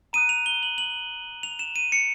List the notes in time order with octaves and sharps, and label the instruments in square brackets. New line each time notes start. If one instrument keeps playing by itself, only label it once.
[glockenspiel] A#5 D#6 F#6 D#7
F7
G7
F#7
F#7
F7
E7
D#7
C#7